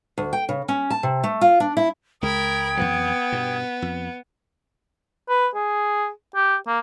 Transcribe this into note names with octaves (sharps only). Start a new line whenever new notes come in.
D2
G5
C#3
C#4
A5
C3
A3
F4
D4
E4
C#2 G#3 A#4 G5 B5 D#6 G#6
F2 E3 F#3 B3
G2 B2
F2
B4
G#4
G4
A#3